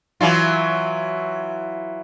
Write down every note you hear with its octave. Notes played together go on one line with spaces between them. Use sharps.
E3 F#3 F4